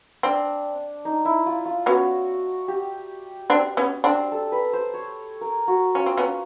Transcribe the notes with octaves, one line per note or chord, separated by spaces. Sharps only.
C4 D4
D#4
E4
F4
F4
B3 C#4 F#4
G4
C4 D4
B3 C#4
C4 D4
A4
B4
C5
C#5
A#4
F#4
C#4 F4
C4
B3 C#4